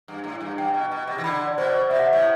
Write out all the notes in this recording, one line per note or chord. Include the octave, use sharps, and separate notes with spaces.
G2
A2
G2
G2 G5
B2
B2
C3
E3
D3 B5
D5
B2 C5
C5
C3 E5
F#5
A2 E5